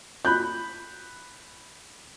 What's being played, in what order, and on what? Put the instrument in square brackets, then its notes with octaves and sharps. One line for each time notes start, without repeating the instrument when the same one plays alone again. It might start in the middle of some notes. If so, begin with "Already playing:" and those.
[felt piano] B5 F#6 G6